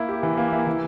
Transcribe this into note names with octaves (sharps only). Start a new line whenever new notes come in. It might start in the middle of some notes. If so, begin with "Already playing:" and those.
Already playing: A#3 E4
G4
E3
A#3
E4
E3